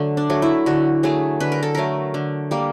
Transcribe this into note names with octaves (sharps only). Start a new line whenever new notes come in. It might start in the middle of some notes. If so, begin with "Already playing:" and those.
Already playing: D3 F#3 A3
D4
F#3 A3
E4
D3 F#4
F#3 A3 G#4
D3 B4
A#4
A4
F#3 A3 A#4
D3
G3 A#3